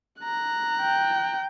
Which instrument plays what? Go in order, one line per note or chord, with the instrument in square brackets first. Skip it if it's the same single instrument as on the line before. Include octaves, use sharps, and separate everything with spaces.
[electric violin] A#5 F#6
[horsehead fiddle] G5